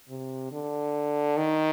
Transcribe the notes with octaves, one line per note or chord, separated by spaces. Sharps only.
C3
D3
D#3